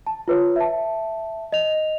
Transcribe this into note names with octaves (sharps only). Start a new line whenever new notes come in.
A5
F4 B4 C#5
E5 A5
D#5 F7